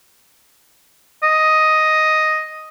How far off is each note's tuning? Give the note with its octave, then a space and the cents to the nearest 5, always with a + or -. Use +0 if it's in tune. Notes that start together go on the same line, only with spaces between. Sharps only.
D#5 +5